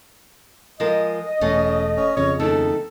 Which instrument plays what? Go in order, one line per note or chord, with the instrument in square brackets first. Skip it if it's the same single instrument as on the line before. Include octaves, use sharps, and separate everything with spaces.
[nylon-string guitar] F3 G#3 A#4 [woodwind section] D#5
[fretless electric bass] E1 [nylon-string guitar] A3 G#4 [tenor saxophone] C#4
[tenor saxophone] C#4
[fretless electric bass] F2 C#3 [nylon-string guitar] C#4 [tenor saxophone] C#5
[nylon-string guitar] D#2 D#3 A3 [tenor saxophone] A4